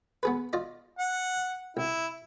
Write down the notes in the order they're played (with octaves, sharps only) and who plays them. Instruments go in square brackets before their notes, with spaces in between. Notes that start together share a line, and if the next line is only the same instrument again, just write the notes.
[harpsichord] B3 G#4 B4
F4 D5 D#5
[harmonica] F#5
[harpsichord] C2 [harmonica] E4